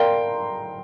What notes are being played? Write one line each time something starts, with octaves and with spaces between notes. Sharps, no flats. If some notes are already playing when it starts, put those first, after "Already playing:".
Already playing: A#4 D5 F5 G5 A#5 C6